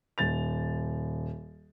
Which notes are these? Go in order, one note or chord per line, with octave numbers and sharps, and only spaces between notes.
D#1 A6 F7